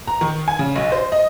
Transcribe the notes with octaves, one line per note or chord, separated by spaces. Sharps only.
A#5
D#3
G#5
C#3
B1
C5
D#5